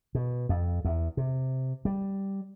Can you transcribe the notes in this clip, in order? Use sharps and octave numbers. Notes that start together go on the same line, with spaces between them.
B2
F2
E2
C3
G3